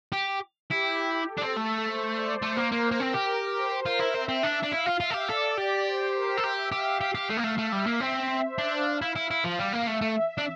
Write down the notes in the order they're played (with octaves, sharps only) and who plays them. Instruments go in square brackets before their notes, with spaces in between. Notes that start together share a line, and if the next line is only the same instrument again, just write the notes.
[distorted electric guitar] G4
[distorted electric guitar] E4 [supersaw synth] G4
[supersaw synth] G4
A4
[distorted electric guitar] D4
C4
[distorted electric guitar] A3 [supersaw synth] A4
[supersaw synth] C5
D5
[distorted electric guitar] A3 [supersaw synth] C5
[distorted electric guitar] A#3
[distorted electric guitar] A#3 [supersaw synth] A#4
[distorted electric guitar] A#3
C4
G4
[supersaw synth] C5
[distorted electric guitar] F4 [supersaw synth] A#4
[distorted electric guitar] E4
[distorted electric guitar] C4 [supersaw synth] E5
[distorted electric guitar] C4
D4
D4
[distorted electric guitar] E4 [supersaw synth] F5
[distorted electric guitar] F4
[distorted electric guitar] F4 [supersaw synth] E5
[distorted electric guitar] A4
G4
[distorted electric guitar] A4 [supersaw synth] D5
[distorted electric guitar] G4
[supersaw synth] C5
A#4
[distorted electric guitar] A4
[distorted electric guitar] G4 [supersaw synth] E5
[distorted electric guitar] G4 [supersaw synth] F5
[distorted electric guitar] G4
G4
A3
A#3
A3
[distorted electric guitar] A3 [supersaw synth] E5
[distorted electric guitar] G3
A#3
C4
[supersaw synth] C5
[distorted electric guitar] D4
[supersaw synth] F5
[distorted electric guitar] E4
E4
E4
F3
[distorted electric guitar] G3 [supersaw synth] F5
[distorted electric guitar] A#3
[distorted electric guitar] A3 [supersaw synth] E5
[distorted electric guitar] A3
D4